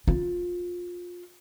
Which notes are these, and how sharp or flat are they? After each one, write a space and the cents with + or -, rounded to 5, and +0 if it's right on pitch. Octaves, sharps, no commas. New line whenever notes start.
F4 +20